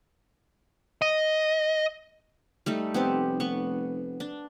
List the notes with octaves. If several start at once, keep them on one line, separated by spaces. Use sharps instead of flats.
D#5
G3 A3 D#4
F1 B3 C4 G4
B3 C#6
D4